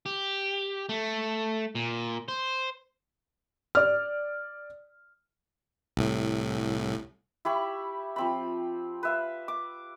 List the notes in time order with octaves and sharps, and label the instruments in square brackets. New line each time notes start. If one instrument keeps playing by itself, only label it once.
[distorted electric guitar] G4
A3
A#2
C5
[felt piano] D5 F6
[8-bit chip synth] C2 A2
[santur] E4 G4 B5 C#6
F3 C4 B5
B4 E5 F5
D6